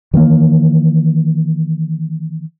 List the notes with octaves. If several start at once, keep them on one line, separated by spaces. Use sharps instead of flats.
D#3 E3 G#3 A#3